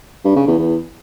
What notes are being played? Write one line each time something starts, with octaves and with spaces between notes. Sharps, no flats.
G2
C#3
E2
E2